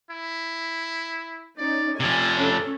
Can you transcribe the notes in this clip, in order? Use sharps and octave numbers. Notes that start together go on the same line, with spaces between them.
E4
C#4 D#4 D5
C3 F3 D5 G#5
C#4 D4 A4